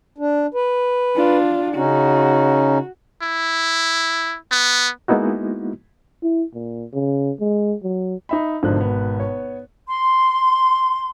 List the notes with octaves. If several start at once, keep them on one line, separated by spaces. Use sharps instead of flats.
D4
B4
D4 F4
C#3 C#4 D#4 F#4
E4
B3
G#3 A#3 B3 D#4 E4 F#4
E4
A#2
C#3
G#3
F#3
D#4 E5 B5
G#1 B2 D3 F3 D#4 F#6
B3
C#5
C6